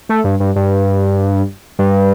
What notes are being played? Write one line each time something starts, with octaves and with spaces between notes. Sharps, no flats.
A3
G2
G2
G2
G2